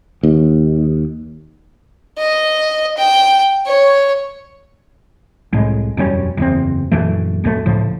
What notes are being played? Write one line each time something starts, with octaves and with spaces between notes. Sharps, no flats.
D#2
D#5
G5
C#5
C2 A2 G#3
E1 F#2 G3 C#4
F#1 E2 C4
A#1 F#2 E3 A3
A#1 F#2 D3 A3
C#2 A2 F3